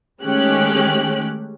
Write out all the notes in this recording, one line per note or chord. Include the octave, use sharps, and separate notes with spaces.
D#3 G#3 A3 C#4 G4 F#6